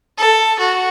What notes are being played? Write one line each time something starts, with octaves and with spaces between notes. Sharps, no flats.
A4
F#4